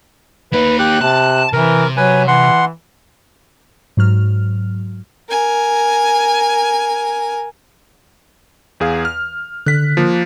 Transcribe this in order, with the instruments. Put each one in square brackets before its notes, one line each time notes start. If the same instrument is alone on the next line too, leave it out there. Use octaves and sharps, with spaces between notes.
[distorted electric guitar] A#3 D#4 [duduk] B4
[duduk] G4 [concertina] F#6
[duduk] C3 [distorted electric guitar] A5
[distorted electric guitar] C3 [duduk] E3 [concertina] A#4
[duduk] F#3 [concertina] B4 G#5
[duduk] E3 [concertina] F#5 C6
[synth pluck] G#2 F#3 F6
[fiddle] A#4 G#5
[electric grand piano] E2 G#4 F5
F6
[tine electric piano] D3 [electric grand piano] F#6 B6
[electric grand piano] F3 A#3